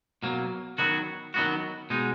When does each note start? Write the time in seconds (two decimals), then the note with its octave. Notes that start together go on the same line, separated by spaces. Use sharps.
0.23 B2 F#3 A#3
0.78 D#3 F#3 B3 F#4
1.34 D#3 F#3 B3 F#4
1.90 B2 G#3 D#4